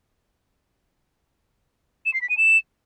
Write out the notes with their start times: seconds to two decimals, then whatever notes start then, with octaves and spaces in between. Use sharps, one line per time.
2.06 E7
2.14 C7
2.21 B6
2.29 D#7
2.37 E7